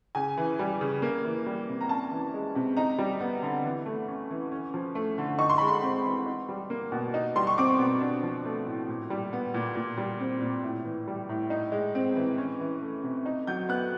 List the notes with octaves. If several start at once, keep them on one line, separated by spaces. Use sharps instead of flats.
C#3 G#5
E3
G3
C#3
A#3
E3
G3
C3
A#5
C#4 A5
E3
G#3
C3
D#4 A#5
G3
B3
D3
E3
A3
C#4
E3
C#4
F3
A3
D3
D#4 C#6
C6
G#3 B5
C6
C4
E3
D#4
G3
A#3
B2
D#4
G3 C6
C#6
C4 D6
B2
D4
F3
A3
A2
A#2
G3
B3
A#2
A#2
G3
C4
A#2
A2
E3
G3
A2
D#4
G#3
C4
E3
C#4
E3
A3
C3
D#4
F#3 G6
B3 F#6